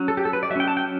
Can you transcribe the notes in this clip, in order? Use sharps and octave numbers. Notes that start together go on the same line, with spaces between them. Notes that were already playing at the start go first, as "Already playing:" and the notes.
Already playing: F#3 C#4
A4
G4
A4
B4
D5
F#3 E5
C#4 G5
A5
G5